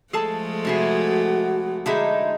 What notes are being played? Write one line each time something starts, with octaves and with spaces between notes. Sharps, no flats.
F3 G#3 A3 G#4 A4 A5
C3 E4 F#4 G#4
D3 G#3 D#4 E4 E5